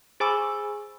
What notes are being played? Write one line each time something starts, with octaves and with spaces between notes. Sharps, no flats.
G#4 C5 G#5 B5 D6 E6